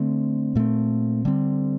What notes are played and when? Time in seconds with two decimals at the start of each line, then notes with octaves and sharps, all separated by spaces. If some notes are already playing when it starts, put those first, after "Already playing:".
Already playing: D3 A3 C4
0.55 A#2 A3 C4
1.25 D3 G3 C4